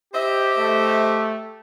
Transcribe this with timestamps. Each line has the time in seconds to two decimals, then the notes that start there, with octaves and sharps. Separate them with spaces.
0.14 G4 C5 D#5 E5
0.58 A3